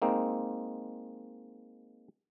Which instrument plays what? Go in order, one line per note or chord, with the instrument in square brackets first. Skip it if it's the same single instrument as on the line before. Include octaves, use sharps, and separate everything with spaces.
[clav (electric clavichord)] G#3 A#3 C4 D#4